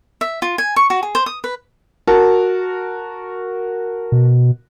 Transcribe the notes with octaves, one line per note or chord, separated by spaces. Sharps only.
E5
F4
G#5
C#6
F#4
G#4
C5
D#6
B4
F#4 A#4 A5
B2